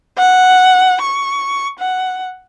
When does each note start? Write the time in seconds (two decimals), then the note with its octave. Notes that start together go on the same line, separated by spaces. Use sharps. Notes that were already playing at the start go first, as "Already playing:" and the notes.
0.18 F#5
1.01 C#6
1.79 F#5